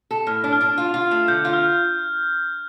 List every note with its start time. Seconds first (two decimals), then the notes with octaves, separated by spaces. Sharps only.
0.11 A4
0.27 A2 F6
0.44 D4
0.53 F6
0.61 D4
0.78 F4
0.94 F4
1.11 A3
1.28 D3 G6
1.45 F4
1.53 F6